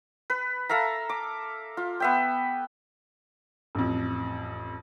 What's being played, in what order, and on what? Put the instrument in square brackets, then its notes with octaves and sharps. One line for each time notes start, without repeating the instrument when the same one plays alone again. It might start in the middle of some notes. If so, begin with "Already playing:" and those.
[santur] B4
A4 E5 F5 A#5
D6
F4
B3 E5 G5
[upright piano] A1 F2